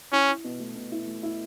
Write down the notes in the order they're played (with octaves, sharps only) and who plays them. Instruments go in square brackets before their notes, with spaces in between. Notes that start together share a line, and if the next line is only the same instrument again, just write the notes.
[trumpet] C#4 [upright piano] E4
[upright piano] E4
B2
A3
B2
E4
A3
E4